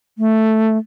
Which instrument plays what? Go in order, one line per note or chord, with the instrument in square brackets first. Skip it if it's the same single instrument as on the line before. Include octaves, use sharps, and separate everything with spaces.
[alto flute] A3